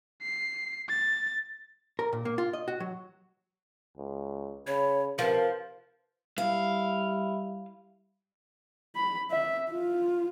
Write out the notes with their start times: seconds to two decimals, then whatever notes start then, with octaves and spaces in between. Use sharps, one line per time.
0.22 C7
0.89 A6
1.99 A#4
2.13 A#2
2.25 A#3
2.38 F4
2.53 D#5
2.68 F#4
2.80 F#3
3.97 C#2
4.67 C#3 C#5 B5
5.19 C3 F3 A#4 B4
6.38 G3 E4 F5
8.95 B5
9.31 E5
9.71 F4